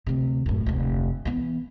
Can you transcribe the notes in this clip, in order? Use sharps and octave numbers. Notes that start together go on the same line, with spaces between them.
D2 C3
F#2 A2
F1 D2
E3 B3